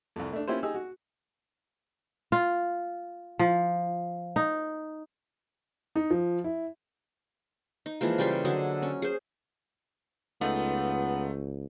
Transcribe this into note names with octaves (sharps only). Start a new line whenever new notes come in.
C2 F2
A3 D4
A#3 C#4 E4 F4 G4 C5
D#4 G4 G#4 E6
F#4
F4
F3
D#4
D#4
F3
E4
D#4
E3 F3 G#3 A#3
C#3 G3 G4 C6
D3 F#3 G#4 D#5
C#4
G#4 C5
C#2 A3 B3 D#4 F4